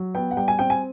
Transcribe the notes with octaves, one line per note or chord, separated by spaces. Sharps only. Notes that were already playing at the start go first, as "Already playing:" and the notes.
Already playing: F#3
B3 G5
F#5
G3 G5
G#5
C4 G5
G#5